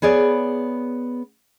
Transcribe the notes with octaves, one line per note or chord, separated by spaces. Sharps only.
B3 G#4 C#5 D5